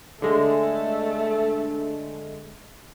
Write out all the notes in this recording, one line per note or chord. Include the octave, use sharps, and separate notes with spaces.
D3 G#3 A3